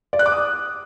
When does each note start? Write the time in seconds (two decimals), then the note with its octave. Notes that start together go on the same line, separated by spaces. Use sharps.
0.13 D5
0.19 F#6
0.26 D6
0.32 D#6